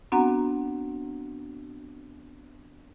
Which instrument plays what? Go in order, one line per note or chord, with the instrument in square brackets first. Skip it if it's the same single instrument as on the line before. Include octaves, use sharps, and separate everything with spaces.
[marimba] B3 C4 D4 F#4 F#5 A#5